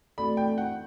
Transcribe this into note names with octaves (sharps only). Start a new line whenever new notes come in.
A3 C4 F#4 A4 D5 B5
G5
F#5